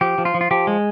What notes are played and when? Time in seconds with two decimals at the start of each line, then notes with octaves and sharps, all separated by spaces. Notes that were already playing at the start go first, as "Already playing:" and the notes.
0.01 F3 G4
0.18 F3
0.25 F4
0.34 F3
0.41 F4
0.51 F3 G4
0.67 G#3